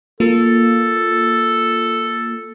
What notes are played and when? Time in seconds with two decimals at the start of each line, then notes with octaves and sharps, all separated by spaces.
0.20 A#3 F4 A4